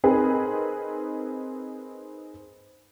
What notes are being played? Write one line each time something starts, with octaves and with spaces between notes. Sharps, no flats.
C4 D#4 G#4 A#4 B4